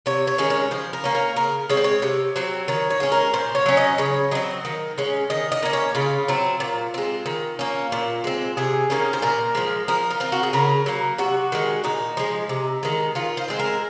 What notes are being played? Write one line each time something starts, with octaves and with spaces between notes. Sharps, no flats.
C3 C#5
C#5
D#3 G#3 C#4
C#5
F3 C5
A#4
A#3 C#4
A#4
C#3 A#4
G#3 C4 C5 C#5
C#5
C3 C#5
F#3 C4
D#3 C#5
C#5
G#3 C#4
A#4
A#2 C5
C#5
F#3 C#4
D#5
C#3 C#5
F#3 C4 D#5
D#3
G#3 C#4
D#3 D#5
D#5
A#3 C#4
C#5
C#3 F4
F#3 C4
A#2
G#3 C4
D#3
A#3 C#4
A#2
G#3 C4
C3 G#4
D#3 A#3 C#4
C5
A#2 A#4
F3 G#3
F3 A#4
D#4
C4 F4
F#4
G#4
C#3 A#4
F#3 A#3
C3 F#4
D#3 G#3
A#2 D#4
F3 G#3
C3
D#3 G#3
D#3 F4
C5
G#3 C4
A#4